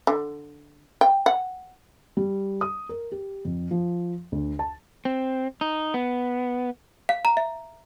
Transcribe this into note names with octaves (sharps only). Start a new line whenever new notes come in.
D3
G5
F#5
G3
D#6
A#4
G4
F2
F3
D2
A5
C4
D#4
B3
F5
A#5
E5